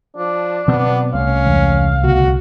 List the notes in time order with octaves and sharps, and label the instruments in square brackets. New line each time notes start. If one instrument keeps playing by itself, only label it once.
[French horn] F3 [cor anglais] D4
[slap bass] B2 F#3 C4 [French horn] B3
[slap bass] C2 A3 [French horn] C#4 [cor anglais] F5
[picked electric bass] E2 E3 G#3
[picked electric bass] D2 C#3 B3 [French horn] F#4